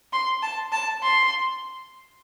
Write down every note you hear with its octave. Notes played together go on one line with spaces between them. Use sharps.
C6
A5
A5
C6